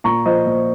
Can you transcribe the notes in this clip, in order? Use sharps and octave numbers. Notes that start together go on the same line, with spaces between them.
A#2 A#5 C#6
F3 C5 D#5
A#2